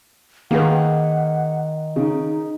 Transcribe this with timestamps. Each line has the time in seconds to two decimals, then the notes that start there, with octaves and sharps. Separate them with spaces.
0.51 D#3 A#3 G#4 B4 F#5
1.96 C#3 D#4